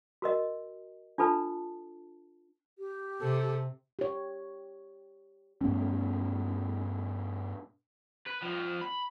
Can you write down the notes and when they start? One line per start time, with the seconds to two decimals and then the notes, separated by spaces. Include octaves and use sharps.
0.22 F#4 A#4 D#5
1.18 D4 F4 A4 B4 A5
2.78 G4
3.21 C3 A4
3.99 G4 C#5
5.61 G2 A3 B3 C#4
8.27 B4
8.43 F2 F3
8.82 B5